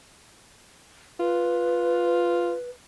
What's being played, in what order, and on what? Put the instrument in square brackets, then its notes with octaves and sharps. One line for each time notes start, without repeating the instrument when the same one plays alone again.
[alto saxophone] F4 [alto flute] B4